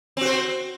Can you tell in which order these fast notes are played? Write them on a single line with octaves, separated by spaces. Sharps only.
C4 F#4 C5